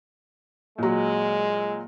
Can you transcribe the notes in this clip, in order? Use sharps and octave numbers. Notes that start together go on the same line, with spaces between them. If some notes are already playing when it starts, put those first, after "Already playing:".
A#2 F#3 G#3